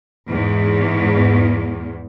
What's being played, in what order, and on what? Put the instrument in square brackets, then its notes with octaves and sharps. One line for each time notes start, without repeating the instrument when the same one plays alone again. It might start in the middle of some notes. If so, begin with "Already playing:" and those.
[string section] E2 G#2